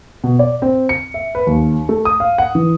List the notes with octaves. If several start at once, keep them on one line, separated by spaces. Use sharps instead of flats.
B2
D5
C4
C#7
E5
B4
D#2
A3
D#6
F5
F#5
E3